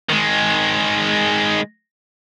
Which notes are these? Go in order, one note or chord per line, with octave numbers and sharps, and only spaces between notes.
D#3 G#3